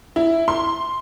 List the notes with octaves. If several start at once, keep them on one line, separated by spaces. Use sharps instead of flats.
E4
C6